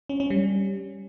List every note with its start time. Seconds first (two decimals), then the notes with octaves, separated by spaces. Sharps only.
0.09 C#4
0.20 C#4
0.30 G3